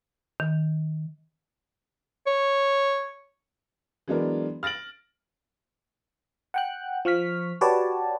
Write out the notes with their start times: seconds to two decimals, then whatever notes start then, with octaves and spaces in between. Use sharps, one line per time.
0.40 D#3
2.27 C#5
4.08 E3 F#3 G#3 B3 D4 A#4
4.63 F6 A6 A#6 D7 F#7
6.54 F#5 G5 F#6
7.05 F3 C#6 F6 B6
7.61 F#4 G4 B4 C#5 D5 A5